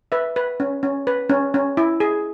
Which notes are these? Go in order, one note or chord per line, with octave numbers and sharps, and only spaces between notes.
B4 E5
B4
C#4
C#4
B4
C#4
C#4
E4
G#4